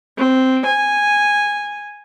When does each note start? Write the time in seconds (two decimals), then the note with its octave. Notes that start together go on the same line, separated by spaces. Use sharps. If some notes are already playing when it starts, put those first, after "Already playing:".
0.18 C4
0.66 G#5